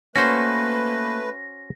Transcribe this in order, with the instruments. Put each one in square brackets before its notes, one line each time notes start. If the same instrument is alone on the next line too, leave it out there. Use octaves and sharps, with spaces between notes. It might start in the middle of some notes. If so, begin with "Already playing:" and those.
[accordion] A3 B4 [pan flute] A#3 [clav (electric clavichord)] C#4 F#4 C5 [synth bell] A#6